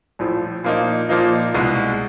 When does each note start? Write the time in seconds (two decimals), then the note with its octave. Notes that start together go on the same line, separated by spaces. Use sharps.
0.19 A#1 A2 F3
0.64 A#2 F3 A#3 D#4
1.09 A#2 F3 A#3 D#4
1.54 C2 B2 G#3